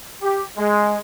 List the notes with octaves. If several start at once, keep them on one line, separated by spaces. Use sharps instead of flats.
G4
G#3